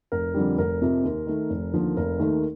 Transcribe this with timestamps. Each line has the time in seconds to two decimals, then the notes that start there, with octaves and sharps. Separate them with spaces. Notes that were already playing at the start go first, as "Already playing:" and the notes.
0.12 F1 A#4
0.34 F2 D3 G3
0.58 F1 A#4
0.81 F2 C3 F3
1.04 D#2
1.27 D#3 A3
1.50 F1
1.73 D#2 D3 F3 A#3
1.97 F1 A#4
2.19 D#2 D#3 A3